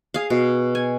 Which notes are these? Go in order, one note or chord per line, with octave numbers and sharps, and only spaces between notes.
G#4 F5
B2
G#5